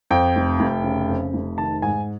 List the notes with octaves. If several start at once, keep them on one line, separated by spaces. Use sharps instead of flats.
F2 G5
F1
F1
C#3
F2
F1
D#3 A5
G#2 G#5